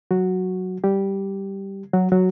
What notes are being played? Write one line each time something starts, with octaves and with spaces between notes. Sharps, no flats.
F#3 F#4
G3 G4
F#3 F#4
F#3 F#4